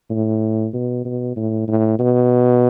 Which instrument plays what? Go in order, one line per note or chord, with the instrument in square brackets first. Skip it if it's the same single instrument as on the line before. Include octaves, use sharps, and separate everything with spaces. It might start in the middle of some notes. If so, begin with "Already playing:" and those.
[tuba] A2
B2
B2
A2
A2
B2